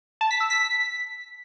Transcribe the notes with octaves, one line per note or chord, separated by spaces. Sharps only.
A5
B6
E6
B6